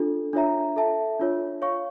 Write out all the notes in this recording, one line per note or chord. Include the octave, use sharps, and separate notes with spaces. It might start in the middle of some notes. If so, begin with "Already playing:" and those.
Already playing: D4 F4 A4
D4 F4 C#5 E5 A#5
A4 E5 A5
D4 F4 C#5
C#5 F5 C#6